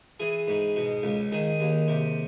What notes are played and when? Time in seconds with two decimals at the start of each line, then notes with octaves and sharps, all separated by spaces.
0.20 E3 G#4
0.48 G#2
0.76 B2
1.03 C#2
1.32 D#3 G#4
1.60 D#2
1.88 C3